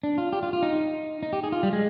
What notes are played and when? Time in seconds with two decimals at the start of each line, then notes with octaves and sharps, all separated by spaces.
0.03 D4
0.18 F4
0.33 G4
0.43 F4
0.53 F4
0.63 D#4
1.23 D#4
1.33 G4
1.44 G#4
1.52 F4
1.63 G3
1.73 G#3